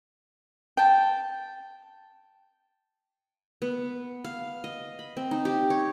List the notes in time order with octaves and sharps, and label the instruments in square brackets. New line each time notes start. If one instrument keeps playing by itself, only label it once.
[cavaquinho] G5 A5
[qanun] B3
F5
D#5
B5
C4
D#4
G4
C#5